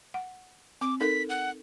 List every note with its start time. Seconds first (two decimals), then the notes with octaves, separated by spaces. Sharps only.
0.14 F#5
0.81 C4 D6
1.00 D#4 A4 A#4 B6
1.29 F#5